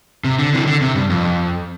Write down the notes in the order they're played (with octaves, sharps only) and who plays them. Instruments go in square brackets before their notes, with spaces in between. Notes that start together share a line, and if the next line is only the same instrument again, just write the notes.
[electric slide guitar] C3
D3
C3 E3
D3
C3
G2
F2